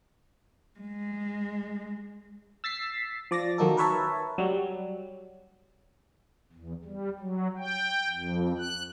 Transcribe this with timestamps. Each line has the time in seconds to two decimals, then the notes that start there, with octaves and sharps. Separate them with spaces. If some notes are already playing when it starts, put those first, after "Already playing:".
0.79 G#3
2.64 E6 A6 B6 C7
3.31 F3 D5 A6 A#6
3.58 D#3 F#3 A#3 D#4 A4
3.77 A#4 B4 C#5 E5 A5
4.38 F#3 G3
6.53 E2
6.85 G3
7.19 F#3
7.58 G5
8.10 F2
8.59 F#6